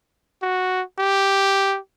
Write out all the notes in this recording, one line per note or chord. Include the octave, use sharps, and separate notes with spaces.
F#4
G4